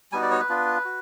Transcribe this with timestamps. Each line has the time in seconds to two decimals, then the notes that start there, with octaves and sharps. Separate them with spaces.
0.12 G3 B3 D#4 F#4 G#5
0.22 D5
0.31 C#5
0.39 B4
0.49 B3 D4 F4
0.85 F#4